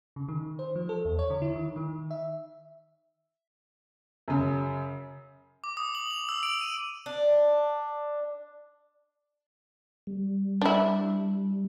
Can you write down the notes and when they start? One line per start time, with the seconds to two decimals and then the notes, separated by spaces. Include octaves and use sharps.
0.16 C#3
0.29 D#3
0.59 C5
0.76 F3
0.89 A4
1.05 E2
1.19 C#5
1.30 D3
1.42 E4
1.56 D#3
1.76 D#3
2.11 E5
4.28 F#2 C#3
5.64 D6
5.77 D#6
5.95 F#7
6.11 F7
6.29 E6
6.43 D7
6.61 D#7
7.06 D4
10.07 G3
10.61 D4 E4